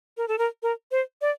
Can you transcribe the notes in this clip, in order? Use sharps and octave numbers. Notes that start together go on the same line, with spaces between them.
A#4
A4
A#4
A#4
C5
D5